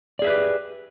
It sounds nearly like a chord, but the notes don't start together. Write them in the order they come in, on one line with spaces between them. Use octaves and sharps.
D5 G#4 E5 B4 G4